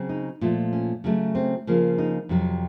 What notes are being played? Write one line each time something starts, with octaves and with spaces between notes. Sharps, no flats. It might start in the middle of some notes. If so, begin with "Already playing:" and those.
Already playing: C#3 F#3 C4
D#4
A#2 F3 A3
C#4
C#3 F#3 A3
C4
C#3 F3 A#3
D#4
F2 C3 F#3